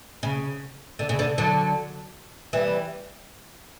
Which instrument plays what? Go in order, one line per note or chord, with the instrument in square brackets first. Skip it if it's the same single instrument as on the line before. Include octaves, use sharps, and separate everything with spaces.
[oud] C#3
D3
C#3
D3
D3 F#3
E3 G3